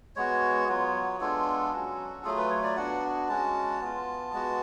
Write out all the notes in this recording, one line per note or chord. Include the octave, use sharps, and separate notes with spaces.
G#3 B3 F#4 C#5
F#3 B3 F4
G#3 B3 D4 F4 A4
F#3 C#4 F#4
F#3 A3 F4 G#4
B4
C#5
D5
B3 D4 F#4 F#5
G#3 C#4 F#4 A5
B3 F4
G#3 B3 F#4